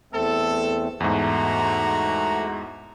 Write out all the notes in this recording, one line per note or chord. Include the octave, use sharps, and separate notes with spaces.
E2 A3 C4 A4
E2 G#2 A3 F#4 A#5